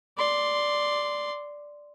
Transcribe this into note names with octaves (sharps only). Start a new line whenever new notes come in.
D5 C6